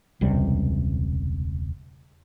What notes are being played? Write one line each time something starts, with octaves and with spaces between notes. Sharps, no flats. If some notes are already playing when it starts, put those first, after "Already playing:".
E1 C#2 C3 G3